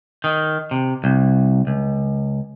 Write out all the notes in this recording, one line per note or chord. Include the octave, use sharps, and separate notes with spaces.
D#3
C3
C2
C#2